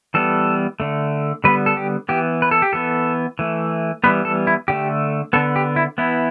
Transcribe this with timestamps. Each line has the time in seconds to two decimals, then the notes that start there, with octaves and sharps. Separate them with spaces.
0.14 E3 G3 B3 A4
0.80 D3 A3
1.44 D3 G3 B3 B4
1.66 A4
1.77 G4
2.09 E3 B3 G4
2.42 B4
2.51 A4
2.62 G4
2.73 E3 B3 A4
3.39 E3 A3
4.04 E3 G3 B3 B4
4.25 A4
4.47 E4
4.68 D3 A3 G4
5.33 D3 B3 A4
5.56 G4
5.76 E4
5.98 E3 B3 E4